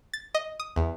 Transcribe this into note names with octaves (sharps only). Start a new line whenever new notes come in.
A6
D#5
D#6
E2